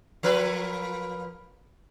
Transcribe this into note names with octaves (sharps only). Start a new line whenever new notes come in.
F3 A#4 B4